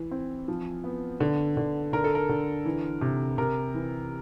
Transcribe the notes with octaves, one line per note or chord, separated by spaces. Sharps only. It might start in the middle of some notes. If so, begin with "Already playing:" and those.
Already playing: E3
C4
F3
B3
D3
D3
D3 A#4
A4
A#4
D3
E3
C3
C3 A#4
E3